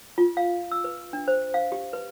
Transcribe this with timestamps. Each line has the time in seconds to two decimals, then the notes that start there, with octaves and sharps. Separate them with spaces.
0.18 F4
0.37 F5
0.71 E6
0.84 B4
1.13 D4
1.28 C5
1.54 F5
1.72 G4
1.93 B4